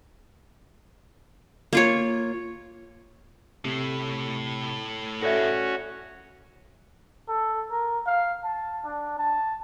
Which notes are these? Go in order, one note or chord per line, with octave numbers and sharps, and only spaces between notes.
A#3 F4 C#5
A2 C3 A3
C#4 F#4 A4 D5 E5 A#6
A4
A#4
F5
A5
D4
A5